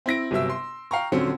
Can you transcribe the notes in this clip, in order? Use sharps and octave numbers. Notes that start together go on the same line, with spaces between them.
C4 E4 A#6 D7
G1 C3 F#3 E5 E6
C6
F5 G5 A#5 C#6
D#1 D3 F#3 C4 C#4 C#7